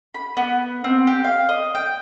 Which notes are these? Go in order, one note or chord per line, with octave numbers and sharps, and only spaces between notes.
B5
B3
C4
G4
F5
D#5
G5